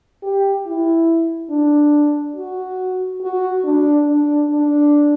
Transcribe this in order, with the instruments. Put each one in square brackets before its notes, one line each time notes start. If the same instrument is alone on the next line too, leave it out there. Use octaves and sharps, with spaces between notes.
[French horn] G4
E4
D4
F#4
F#4
D4
D4
D4